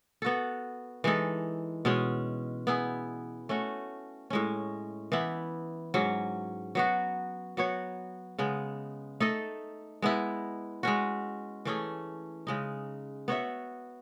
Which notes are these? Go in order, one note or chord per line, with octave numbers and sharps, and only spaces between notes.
B3 F#4 A4
E3 G#3 D#4 A4
B2 G#3 C#4
B3 E4 G#4
A3 C#4 F#4
A2 G#3 C#4
E3 B3 E4
G#2 F#3 C#4
F#3 B3 F#4
F#3 B3 F#4 C#5
C#3 G#3 B3
A3 D#4 A4 D#5
G#3 B3 E4
G#3 C#4 F#4
E3 A3 C#4 G#4
C#3 G#3 D#4
B3 F#4 C#5 E5